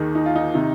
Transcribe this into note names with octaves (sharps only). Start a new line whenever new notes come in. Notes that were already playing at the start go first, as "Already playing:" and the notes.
Already playing: D#2 D#3 G#4
D#4
F4
D#4
C3 D#3